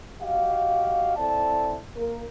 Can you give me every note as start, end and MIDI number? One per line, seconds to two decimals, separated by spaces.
0.21 1.17 66
0.21 1.17 67
0.21 1.17 75
0.21 1.17 77
1.17 1.77 60
1.17 1.77 64
1.17 1.77 69
1.17 1.77 74
1.17 1.77 81
1.97 2.25 58
1.97 2.25 70